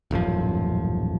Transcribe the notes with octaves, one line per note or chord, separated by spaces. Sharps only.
D#1 A1 F#2 F3